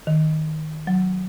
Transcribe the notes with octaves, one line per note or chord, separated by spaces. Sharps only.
D#3
F#3